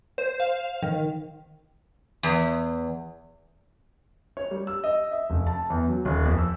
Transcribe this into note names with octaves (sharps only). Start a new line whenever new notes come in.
C5
F5
D#3
E2
C#5
G3
E6
D#5
E5
F1
A5
E2
F#3
D#1
F2
E6